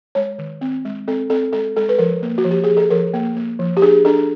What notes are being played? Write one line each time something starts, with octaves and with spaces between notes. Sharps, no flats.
G#3 C#5
D#3
C4
G#3
C4 A4
C4 A4
G#3 A4
G#3 A4
B4
F3 A#4
A#3
F#4
F3
G4
F3 G#4
A4
F3 A#4
A#3
A#3
F3
G4
D4 G#4
D4 A4